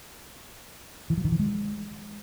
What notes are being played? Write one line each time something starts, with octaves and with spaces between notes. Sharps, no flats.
E3
F#3
D#3
E3
G#3